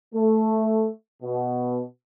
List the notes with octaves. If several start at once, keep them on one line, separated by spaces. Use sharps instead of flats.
A3
B2